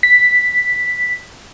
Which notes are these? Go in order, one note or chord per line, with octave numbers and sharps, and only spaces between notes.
B6